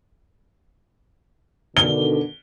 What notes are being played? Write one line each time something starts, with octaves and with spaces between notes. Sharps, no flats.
B2 D3 D#3 G7